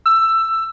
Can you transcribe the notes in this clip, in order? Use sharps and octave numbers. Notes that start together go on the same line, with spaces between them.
E6